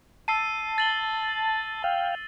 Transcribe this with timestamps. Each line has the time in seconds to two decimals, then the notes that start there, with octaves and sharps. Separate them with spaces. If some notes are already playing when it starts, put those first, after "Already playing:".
0.28 A5 E6 C7 D#7
0.78 A6 F#7 G7
1.84 F5 G5